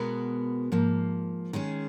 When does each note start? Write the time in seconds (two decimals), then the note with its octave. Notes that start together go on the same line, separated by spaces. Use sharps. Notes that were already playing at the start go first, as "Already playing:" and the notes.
Already playing: B2 G#3 B3 F#4 A#4
0.72 G#2 F3 A#3
1.53 D#3 G#3 C#4 G#4